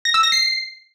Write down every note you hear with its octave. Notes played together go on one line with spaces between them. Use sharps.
A#6
E6
A#6
C7